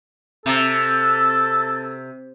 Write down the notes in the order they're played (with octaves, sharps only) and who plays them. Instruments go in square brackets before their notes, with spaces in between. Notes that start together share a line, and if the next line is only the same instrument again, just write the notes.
[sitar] C3 [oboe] A4